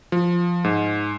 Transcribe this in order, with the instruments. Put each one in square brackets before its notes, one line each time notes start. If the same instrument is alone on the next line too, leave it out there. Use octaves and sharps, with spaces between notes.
[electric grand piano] F3
G#2